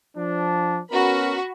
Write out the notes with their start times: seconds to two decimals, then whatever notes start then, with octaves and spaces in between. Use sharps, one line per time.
0.17 F3 D4
0.92 B3 C#4 F#4 A#4 B5